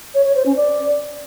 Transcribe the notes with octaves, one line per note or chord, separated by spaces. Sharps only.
C#5
C#5
C5
C#4
D5